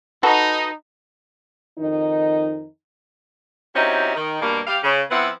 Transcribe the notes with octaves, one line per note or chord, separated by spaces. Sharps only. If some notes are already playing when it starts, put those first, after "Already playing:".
D#4 F#4 A4 B4
F2 D#3 D#4
F#3 C4 C#4 D#4 E4 G4
D#3
G2 B2 G3 A#3
G3 G4 F5
C#3
F3 B3 C4 E4 F#5